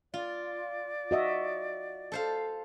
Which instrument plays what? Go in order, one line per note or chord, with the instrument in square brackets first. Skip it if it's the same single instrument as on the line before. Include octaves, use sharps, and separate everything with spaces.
[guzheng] F4 [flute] D5
[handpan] F#4 D#5 E5
[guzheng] A4 C5 F5